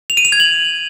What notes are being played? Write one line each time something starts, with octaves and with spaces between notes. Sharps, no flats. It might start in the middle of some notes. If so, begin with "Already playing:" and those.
F7
D#7
F7
G#6
F#7